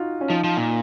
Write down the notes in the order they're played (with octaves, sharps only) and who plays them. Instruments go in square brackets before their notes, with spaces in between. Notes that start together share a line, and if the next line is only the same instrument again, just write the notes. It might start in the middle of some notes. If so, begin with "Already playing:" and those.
Already playing: [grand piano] D#4 F4 F#4
C#4
[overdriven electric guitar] F3 [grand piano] D#4
[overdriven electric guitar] F3
A#2